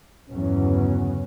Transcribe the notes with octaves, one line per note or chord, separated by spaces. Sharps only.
G1 E2 C#3 F#3 B3 C#4